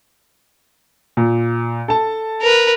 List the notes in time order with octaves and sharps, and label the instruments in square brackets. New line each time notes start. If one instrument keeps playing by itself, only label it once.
[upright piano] A#2
A4 A5
[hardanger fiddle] A#4 B4